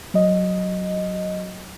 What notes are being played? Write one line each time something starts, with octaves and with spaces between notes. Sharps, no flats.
F#3 D#5